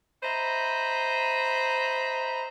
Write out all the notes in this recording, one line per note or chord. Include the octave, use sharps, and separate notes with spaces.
C5 D#5 E5 A#5 B5